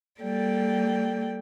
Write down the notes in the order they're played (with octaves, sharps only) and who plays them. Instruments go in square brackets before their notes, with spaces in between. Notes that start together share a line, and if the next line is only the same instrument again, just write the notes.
[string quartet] G3 A#3 A4 D5 G5